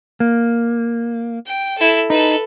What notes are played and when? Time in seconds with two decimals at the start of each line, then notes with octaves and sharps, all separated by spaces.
0.20 A#3
1.46 G5
1.78 E4 A4
2.10 D#4 A4 B4